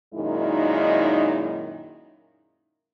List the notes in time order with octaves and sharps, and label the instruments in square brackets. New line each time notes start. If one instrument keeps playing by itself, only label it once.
[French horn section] F#2 A#2 D#3 G#3 D#4 E4